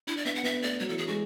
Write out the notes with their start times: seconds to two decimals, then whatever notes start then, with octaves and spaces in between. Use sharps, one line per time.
0.07 D4 E4
0.17 D5
0.25 B3 E5
0.35 F#5
0.43 B3 E5
0.62 A3 D5
0.80 F#3 C#5
0.89 E3 A4
0.98 G#4
1.08 G#3 F#4